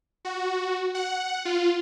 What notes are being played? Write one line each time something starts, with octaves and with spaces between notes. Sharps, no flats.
F#4
F#5
F4